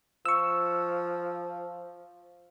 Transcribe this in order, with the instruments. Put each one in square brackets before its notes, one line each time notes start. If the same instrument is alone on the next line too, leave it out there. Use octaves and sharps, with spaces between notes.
[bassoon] F3 [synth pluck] C#6 E6